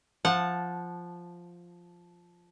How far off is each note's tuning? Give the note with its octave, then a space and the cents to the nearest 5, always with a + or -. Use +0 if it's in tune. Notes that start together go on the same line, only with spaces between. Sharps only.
F3 +0 F#5 -15 A5 +0